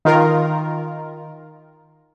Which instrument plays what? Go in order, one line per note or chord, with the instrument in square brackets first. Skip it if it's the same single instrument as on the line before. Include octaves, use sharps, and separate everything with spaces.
[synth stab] D#3 F4 A#4